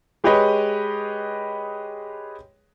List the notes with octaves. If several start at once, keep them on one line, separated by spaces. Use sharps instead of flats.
G#3 G4 G#4 B4 C#5 D#5